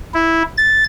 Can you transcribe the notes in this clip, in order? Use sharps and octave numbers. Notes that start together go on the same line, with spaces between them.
E4
A6